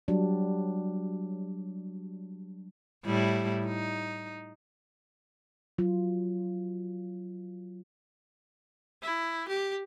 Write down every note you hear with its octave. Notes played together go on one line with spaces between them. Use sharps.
F#3 G3 D4
A2 G3 E4
D#4
F#3 F4
E4
G4